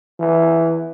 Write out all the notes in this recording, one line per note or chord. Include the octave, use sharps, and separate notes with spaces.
E3